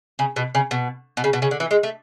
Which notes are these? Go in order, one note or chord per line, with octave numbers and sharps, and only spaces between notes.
C#3
B2
C#3
B2
B2
C#3
B2
C#3
D3
E3
G#3
A3